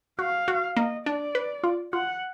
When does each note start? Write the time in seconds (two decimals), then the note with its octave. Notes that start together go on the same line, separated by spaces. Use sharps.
0.19 F#4 F5
0.48 F#4
0.76 A#3 D#5
1.06 D4 D5
1.35 B4
1.64 F4
1.93 F4 F#5